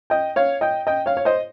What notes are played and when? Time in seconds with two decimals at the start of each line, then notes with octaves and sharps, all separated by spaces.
0.10 D#5 G5
0.36 C#5 F5
0.61 D#5 G5
0.87 D#5 G5
1.06 C#5 F5
1.17 C#5
1.25 C5 D#5